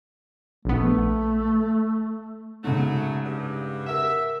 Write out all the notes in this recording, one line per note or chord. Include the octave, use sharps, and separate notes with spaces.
A#1 A3 B3
G#2 C#3 F#3 A3
G2
A#4 E5 F#5